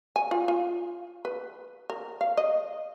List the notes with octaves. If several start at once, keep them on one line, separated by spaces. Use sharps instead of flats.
G#5
F4
F4
B4
A#4
F5
D#5